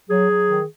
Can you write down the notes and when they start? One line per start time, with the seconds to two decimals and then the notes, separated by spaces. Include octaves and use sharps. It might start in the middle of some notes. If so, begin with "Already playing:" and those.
0.10 F#3 G#4
0.30 F#3
0.49 D#3